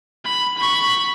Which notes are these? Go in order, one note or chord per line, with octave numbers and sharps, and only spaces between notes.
B5
B5 C#6